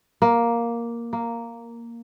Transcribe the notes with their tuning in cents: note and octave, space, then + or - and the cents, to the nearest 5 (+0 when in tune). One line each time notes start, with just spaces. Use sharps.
A#3 +5
A#3 -5